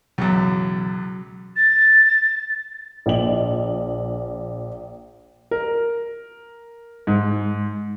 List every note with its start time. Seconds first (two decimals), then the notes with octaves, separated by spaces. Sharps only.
0.18 C#2 F#2 B2 E3 F#3
1.56 A6
3.06 A#1 D#5 F#7
5.51 A#4
7.07 G#2